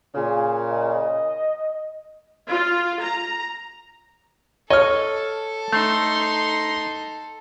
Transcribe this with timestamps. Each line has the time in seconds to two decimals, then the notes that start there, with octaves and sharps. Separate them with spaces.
0.15 A#2 C#3 G#4
0.72 D#5
2.49 F4
3.02 A#5
4.70 A4 C#5 D#5 F6
5.73 A3 D#4 C6